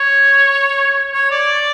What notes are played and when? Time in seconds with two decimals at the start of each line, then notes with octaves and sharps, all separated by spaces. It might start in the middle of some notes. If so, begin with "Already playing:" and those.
Already playing: C#5
1.14 C#5
1.31 D5